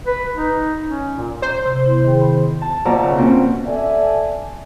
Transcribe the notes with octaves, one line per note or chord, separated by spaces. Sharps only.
B4
D#4
C#4
A#2
C5 A#5
C3
B3 E4
D#3 G#4 G5
B5
A5
D#2 B2 F3 D5 A#5 E6
C#3
B2 A#3 C4 C#4
A4 D5 E5 G#5